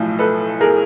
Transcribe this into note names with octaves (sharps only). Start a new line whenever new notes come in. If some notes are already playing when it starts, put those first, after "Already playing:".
Already playing: B1 A2 F3
A4 B4
G#4 A#4